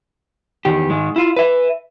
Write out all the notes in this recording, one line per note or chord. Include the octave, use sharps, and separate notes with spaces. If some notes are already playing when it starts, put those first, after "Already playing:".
E2 D#3 G4
G#2 D#3 G#3
E4 F4
B4 E5